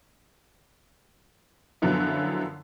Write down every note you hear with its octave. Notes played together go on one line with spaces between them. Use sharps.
F#2 D3 F3 F#3 B3 E4